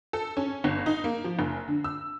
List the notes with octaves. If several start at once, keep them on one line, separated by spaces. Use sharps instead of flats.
A4
C#4
G1
D#4
A#3
F3
F#1
D3
E6